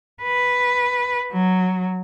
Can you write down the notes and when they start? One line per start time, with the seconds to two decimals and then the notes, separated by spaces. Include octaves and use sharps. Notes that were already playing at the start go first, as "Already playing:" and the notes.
0.23 B4
1.32 F#3